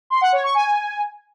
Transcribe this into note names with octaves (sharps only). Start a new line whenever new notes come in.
C6
F#5
C#5
C#6
G#5